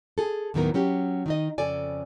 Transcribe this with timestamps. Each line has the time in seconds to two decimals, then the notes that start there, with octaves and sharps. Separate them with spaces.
0.18 G#4 A4
0.54 D#2 A2 D#3 F#3 B3 A#4
0.74 F#3 C#4 G4
1.26 D#3 D#4 D#5
1.58 F2 C#3 A4 D5 G#5